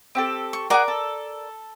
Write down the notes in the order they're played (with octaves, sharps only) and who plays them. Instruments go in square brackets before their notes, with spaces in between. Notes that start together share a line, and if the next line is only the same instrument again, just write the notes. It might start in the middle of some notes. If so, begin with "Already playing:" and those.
[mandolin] C4 G4 A4
[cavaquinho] C#6
[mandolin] F#4 G#4 F#5 [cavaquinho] A#4 D5 D6
[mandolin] A4